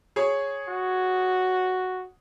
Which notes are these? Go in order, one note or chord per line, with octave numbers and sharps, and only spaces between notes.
G#4 C#5
F#4